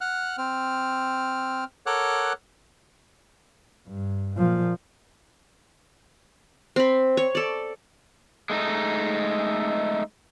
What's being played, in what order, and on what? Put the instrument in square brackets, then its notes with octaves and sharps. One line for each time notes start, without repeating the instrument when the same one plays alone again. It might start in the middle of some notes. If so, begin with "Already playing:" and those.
[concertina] F#5 F6 F#6
C4 F6
A4 A#4 C#5 F#5 D6 F#6
[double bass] G2
A#2 F3
[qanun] C4 B5
C#5
A4 D5
[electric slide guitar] G#3 A3 D#4